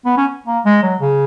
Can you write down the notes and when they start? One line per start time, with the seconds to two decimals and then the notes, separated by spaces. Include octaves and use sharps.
0.05 B3
0.18 C#4
0.47 A#3
0.65 G#3
0.83 F#3
1.01 C#3